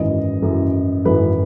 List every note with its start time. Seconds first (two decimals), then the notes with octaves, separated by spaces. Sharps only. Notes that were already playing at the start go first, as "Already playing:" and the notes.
Already playing: G#1 F#2 E3 D#5
0.42 G#1 F#2 E3
1.05 G#1 F#2 E3 B4